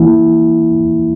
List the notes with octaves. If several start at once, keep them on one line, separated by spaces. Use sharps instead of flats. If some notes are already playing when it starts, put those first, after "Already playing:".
Already playing: E3 A#3 E4